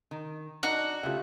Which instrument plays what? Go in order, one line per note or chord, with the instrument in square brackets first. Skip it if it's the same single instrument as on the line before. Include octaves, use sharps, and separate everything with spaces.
[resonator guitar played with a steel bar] D#3
[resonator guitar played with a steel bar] D4 D#4 [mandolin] F#4
[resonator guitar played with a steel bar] C#3 A3 [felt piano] F4 G4 E5